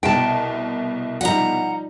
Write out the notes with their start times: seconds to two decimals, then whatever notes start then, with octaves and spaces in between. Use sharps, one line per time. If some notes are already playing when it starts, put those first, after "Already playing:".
0.03 C2 B2 G5 A5
1.21 F3 G3 D#4 F#5 A#5